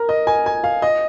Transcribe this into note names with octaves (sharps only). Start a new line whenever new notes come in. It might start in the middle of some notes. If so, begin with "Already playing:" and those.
Already playing: A#4
D#5
G#5
G#5
F5
D#5